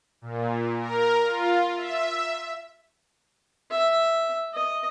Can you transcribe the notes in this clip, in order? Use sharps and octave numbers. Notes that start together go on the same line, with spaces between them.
A#2
A#4
F4
E5
E5
D#5